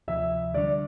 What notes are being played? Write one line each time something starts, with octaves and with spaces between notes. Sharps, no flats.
D2 C3 F3 E5
D3 G3 D4 D5